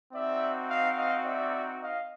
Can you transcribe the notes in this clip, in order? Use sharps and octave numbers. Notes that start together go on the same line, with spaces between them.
C4 D#4 F#4 D5 E5
D#5 F5
D#5 F5
D5 E5
D#5 F5